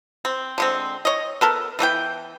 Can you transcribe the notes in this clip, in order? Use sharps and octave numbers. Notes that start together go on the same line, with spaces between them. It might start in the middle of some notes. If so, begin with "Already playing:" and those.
C4
D3 G#3 C4
C#5 D#5
B3 A4 A#4
E3 A3 B3 G5